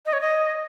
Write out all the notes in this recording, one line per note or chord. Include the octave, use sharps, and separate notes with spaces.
D#5
C#5
D#5